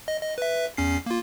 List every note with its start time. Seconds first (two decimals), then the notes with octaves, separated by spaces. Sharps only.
0.08 D#5
0.22 D#5
0.38 B4 E5
0.77 E2 C#4 C7
1.06 A#3 F4